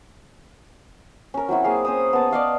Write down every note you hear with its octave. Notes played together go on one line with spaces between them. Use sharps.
C#4 A#4
F#3 C4 E4 F#4
A#3 G#4 F5
C#4 C5 D#6
B3 A5
D5 D#5 F5 C#6